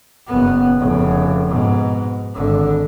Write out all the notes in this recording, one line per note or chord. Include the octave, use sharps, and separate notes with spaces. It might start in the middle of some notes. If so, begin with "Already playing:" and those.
F#1 B3
F1 C#3
G#2 B2
G#1 D3